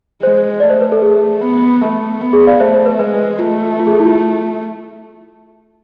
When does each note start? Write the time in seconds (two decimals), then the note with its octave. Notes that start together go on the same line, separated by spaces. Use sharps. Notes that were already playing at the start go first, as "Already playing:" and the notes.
0.23 G#3 C5
0.60 A3 D5
0.70 C5
0.81 B4
0.92 A4
1.02 G#4
1.41 B3
1.81 A3
2.21 B3
2.33 G#4
2.47 D5 F5
2.60 A3 C5 E5
2.74 C5
2.86 B4
2.99 G#3 B4
3.39 A3 F4
3.79 F4
3.86 G#4
3.92 A4
4.00 E4
4.05 F4